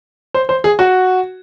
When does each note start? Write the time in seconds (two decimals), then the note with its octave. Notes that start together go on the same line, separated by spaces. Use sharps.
0.34 C5
0.49 C5
0.64 G#4
0.79 F#4